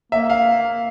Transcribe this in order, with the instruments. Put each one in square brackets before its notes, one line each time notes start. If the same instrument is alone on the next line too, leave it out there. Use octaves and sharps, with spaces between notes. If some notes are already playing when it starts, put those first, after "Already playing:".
[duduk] A#3 [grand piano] E5
[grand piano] F5